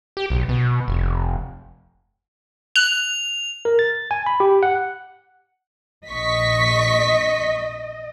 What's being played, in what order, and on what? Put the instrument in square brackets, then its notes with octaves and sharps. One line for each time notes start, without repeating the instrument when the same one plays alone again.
[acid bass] G4
B1
B2
F1
[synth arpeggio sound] F#6 [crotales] F7
[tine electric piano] A#4
A6
G#5
B5
G4
F#5
[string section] A#1 C#6 B6 [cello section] D#5